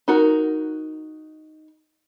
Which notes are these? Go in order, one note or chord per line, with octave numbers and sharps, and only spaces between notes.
D#4 F#4 A#4